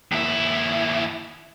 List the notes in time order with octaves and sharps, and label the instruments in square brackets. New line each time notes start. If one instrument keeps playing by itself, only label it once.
[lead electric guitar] D#2 E4